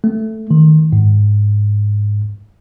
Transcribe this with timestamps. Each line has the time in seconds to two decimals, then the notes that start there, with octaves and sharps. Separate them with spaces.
0.04 A3
0.51 D#3
0.93 G#2